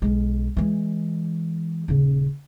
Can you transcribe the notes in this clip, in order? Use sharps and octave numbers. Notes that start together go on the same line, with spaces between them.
B1 G#3
E3 G#3
D#1 C#3